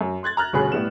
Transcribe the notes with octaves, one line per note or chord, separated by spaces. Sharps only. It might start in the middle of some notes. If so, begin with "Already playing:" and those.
F#2
C6 F#6 G#6 A6
A#5 F6 F#6 A6
G1 B2 C#4 G#4 B5 F#6
A2 G3 B3 E7